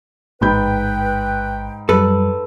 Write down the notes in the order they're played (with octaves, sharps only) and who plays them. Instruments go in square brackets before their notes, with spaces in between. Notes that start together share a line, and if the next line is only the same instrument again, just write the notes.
[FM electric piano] A1 [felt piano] G#2 B5 G6 [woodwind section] B4 G5
[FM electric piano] F#2 G3 [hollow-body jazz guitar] A4 B4